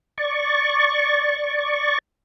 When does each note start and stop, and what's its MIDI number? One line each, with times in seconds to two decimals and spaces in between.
0.18 1.98 74
0.18 1.98 85